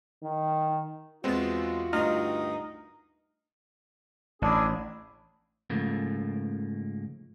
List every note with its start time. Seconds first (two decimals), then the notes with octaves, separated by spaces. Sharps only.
0.23 D#3
1.24 E2 G#3 B3 C4 F4 F#4 A5
1.93 D2 G2 D#3 D#4 F6
4.42 A1 D4 E4 G#4
5.70 G#2 C#3 F3 A3 A#3